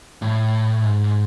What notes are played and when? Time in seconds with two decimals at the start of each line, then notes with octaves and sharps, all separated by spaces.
0.22 A2
0.84 G#2